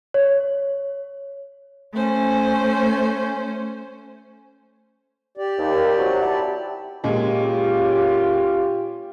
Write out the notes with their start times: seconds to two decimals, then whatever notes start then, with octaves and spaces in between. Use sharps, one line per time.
0.14 C#5
1.93 A3 C#4 C5
5.37 G4 D5
5.58 D#2
5.98 C3 F#3
6.21 E4 A5
7.04 A#2 G#3 C#4 F4 G4